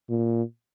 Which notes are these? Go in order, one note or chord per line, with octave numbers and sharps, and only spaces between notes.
A#2